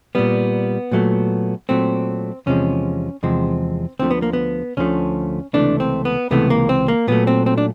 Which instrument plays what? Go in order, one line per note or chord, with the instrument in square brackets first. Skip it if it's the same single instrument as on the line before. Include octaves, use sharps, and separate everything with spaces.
[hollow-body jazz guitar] A#2 G3 B3
A#2 F#3 A3
A#2 F#3 A3 C4
E2 C3 F3 G#3 C#4
E2 C3 F3 G#3 C4
D2 D3 F3 A3 C4
B3
A#3
B3
D2 D3 F3 A3 C#4
C#2 C3 E3 A3 D4
C4
B3
C#2 C3 E3 A3 B3
A#3
C4
A#3
A#2 F#3 A3 B3
C4
C4
D4